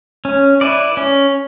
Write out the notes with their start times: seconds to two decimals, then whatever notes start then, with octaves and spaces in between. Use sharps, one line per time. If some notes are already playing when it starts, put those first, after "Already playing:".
0.25 C#4
0.61 E4 B4 D5
0.97 C#4